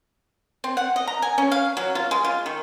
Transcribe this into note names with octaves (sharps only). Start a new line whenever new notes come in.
C4
F#5
D#5
A#5
G#5
C#4
F5
F#3
F4
G#3
F4
D#3